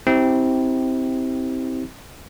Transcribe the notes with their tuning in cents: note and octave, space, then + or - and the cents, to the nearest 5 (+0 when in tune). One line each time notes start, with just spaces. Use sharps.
C4 +0 E4 -40 G4 -5